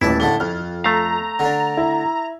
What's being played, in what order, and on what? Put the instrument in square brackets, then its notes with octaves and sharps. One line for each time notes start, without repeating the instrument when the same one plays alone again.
[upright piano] D#1 A1 [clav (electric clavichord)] E4 [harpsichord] B4 A5
[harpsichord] A2 D3 A3 [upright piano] A5 G7
[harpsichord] F2 [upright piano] F6
[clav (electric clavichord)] A3 F5 [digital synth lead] A#5
[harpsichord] D3 D4
[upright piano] E4